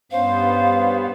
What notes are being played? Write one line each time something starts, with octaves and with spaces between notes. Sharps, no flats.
G2 B3 C#4 C5 F5